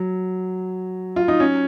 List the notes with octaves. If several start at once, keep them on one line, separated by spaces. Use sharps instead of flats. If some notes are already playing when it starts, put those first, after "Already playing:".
Already playing: F#3
F4
D#4
C#4